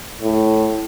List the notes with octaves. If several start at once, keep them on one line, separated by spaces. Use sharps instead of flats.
A2